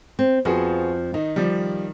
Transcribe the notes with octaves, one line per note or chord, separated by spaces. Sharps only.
C4
F2 F3 B3 F#4 G#4
D#3 D#4
F3 G3